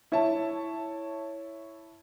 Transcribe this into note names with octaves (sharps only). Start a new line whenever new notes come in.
E4 C#5 E5 A5